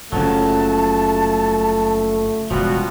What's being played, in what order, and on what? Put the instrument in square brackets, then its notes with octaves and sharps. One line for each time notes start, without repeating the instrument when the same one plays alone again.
[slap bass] F#1 [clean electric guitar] C#3 F3 F#3 [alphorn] A3 [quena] A5
[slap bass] E1 C#2 [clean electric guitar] F3 G3 B3 [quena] F#4